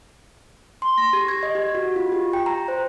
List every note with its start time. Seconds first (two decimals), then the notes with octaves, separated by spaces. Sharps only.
0.82 C6
0.98 A#6
1.13 G4
1.28 G#6
1.43 D#5
1.55 G4
1.75 F#4
1.96 F4
2.12 G4
2.33 G5
2.46 A#5
2.68 C5